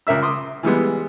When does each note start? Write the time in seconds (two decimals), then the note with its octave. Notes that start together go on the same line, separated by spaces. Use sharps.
0.07 C#2 A#4 E5 E6
0.23 C6 D6 D#6
0.63 E3 G3 G#3 B3